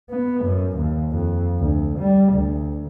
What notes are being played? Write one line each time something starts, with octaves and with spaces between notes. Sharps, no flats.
B3
F#2
D#2
F2
D2
G3
D2